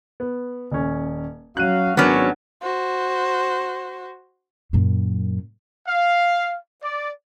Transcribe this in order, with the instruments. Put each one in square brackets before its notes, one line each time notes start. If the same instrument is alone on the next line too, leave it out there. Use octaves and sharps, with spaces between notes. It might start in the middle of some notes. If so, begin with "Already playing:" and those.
[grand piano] B3
D#1 C#4
[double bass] F#3 [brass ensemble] C#4 F#4 F5 [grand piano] F#6 D#7
[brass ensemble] G#1 C#4 [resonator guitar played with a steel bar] F#3 B3 [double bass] D4 [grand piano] A#4 D6 F6
[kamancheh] F#4 C5
[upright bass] F#2 A#2
[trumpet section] F5
D5